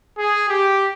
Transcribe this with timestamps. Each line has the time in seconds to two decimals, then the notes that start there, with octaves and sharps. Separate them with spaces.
0.18 G#4
0.49 G4